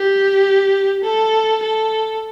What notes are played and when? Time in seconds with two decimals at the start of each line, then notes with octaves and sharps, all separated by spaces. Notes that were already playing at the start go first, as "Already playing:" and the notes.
Already playing: G4
1.03 A4
1.63 A4